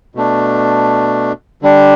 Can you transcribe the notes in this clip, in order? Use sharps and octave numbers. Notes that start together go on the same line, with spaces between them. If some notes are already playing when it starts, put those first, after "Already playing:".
B2 A3 D4
D3 G3 D4